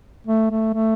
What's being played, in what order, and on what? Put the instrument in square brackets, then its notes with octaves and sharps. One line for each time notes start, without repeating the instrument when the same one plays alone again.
[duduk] A3
A3
A3